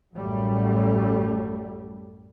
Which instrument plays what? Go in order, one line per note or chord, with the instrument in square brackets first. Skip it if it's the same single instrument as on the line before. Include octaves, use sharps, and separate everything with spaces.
[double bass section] A1 F#2 A2 F#3 G3 A3